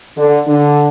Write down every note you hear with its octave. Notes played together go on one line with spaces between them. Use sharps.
D3
D3